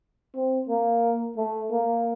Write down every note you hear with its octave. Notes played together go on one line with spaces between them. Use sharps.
C4
A#3
A3
A#3